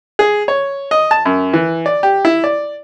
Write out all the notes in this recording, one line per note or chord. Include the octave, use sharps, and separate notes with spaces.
G#4
C#5
D#5
A5
F#2
E3
D5
G4
E4
D5